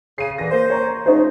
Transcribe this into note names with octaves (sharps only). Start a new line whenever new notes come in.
C#3 C7 D#7
A#2 D3 E3 A#6
A#3 C5
C#5 A#5
C#3 F3 A3 D#4 C5